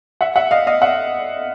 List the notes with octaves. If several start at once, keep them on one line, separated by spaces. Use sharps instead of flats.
E5 F#5
E5 F#5
D#5 F5
D#5 F5
E5 F#5